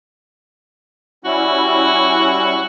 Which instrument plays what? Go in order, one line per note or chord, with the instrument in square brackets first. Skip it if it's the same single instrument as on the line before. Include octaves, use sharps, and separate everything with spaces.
[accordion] G3 C#4 E4 [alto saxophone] F#4